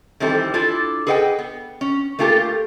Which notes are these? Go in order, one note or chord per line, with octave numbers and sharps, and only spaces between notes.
D#3 E3 G3 C4 E4 A4
D4 E4 F4 A4
G#4 A4 B4 D#5 F#5 G5
B3
C#4
A3 A#3 F4 G4 A4